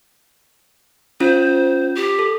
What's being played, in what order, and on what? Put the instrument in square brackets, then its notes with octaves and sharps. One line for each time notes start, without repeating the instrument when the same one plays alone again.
[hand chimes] C#4 F4 [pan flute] C5
[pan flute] G4
[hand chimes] A4